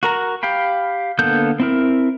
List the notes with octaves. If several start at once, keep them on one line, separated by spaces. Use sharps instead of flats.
F#4 A#4 A#5
G4 F5 G5 B5
D3 A#3 B3 A4 G6
C4 E4 A#4